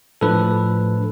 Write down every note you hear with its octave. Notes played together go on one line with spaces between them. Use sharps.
A2 F3 A3 D4 A4 B4